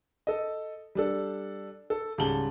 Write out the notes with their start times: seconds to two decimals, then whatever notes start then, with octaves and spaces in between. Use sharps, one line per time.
0.27 A4 D#5
0.95 G3 D4 A4
1.90 A4
2.18 C#2 G#2 G3 A5 F#7 G7